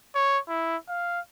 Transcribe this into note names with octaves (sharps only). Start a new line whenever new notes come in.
C#5
E4
F5